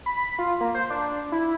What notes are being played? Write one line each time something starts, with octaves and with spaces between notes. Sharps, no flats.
B5
F4
A#3
C5
D4
E4